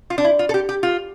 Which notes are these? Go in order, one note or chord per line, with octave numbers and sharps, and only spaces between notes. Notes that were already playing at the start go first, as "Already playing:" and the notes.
F4
D4
E4
F4
A4
G4
G4
F4